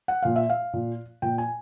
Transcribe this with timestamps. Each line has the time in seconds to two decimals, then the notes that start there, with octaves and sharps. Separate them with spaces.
0.08 F#5
0.23 A#2 F5
0.36 E5
0.50 F5
0.73 A#2
1.22 A#2 G5
1.38 G#5